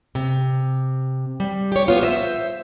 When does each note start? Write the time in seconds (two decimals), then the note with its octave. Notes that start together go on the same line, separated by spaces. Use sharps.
0.15 C3
1.40 G3
1.72 G4 C#5
1.88 B3 F4
2.01 C5 D#5 E5